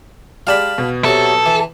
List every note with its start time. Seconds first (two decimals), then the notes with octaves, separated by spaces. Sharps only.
0.47 G#3 G4 D5 F5 A5 B5
0.78 B2
1.05 C3 F#3 A4
1.46 E3